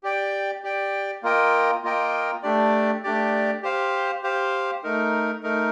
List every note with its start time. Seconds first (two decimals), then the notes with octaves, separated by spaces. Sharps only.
0.03 G4 D5 G5
0.63 G4 D5 G5
1.23 A#3 F4 A#4 D#5 G5
1.83 A#3 F4 A#4 D#5 G5
2.43 A3 D4 G4 D5
3.03 A3 D4 G4 D5
3.63 G4 C5 F5
4.23 G4 C5 F5
4.84 A3 D#4 A#4
5.43 A3 D#4 A#4